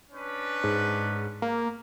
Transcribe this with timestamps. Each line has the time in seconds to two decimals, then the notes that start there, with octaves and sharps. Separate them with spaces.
0.11 C#4 D4 B4
0.64 G#2
1.42 A#3